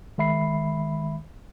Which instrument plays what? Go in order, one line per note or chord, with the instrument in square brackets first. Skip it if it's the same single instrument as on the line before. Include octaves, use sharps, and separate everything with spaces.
[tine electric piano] D#3 G#3 E5 B5 C7